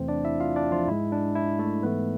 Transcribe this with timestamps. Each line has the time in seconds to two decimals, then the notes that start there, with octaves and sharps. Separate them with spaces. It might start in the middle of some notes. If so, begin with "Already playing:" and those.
Already playing: E2 C3 E3 A3 C4 C5
0.08 D4 D5
0.25 E4 E5
0.40 F4 F5
0.56 D4 D5
0.72 F3 F4
0.88 G#2 G#3 E4
1.12 D4
1.35 E4
1.59 A3 A4
1.83 G#2 E3 A3 B3 B4